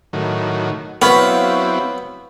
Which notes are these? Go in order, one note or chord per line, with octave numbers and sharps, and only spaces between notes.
A2 D#3 F#3
F#3 B3 C4 E4 C#5 F5 B5